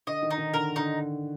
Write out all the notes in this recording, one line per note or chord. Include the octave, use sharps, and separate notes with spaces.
D3 D#5
D#3
D#4
D#3
D3 A#4
D3 D#4